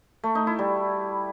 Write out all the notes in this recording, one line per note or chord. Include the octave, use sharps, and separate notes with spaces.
A3
D#4
E4
G3